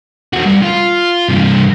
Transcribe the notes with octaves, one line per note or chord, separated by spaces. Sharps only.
E2 F#4
G2
F4
G2 C3